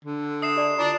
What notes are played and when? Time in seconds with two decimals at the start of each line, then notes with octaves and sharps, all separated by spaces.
0.05 D3
0.42 E5 D#6 C7 E7
0.55 G4 D5 A5
0.78 D4 F4 A#5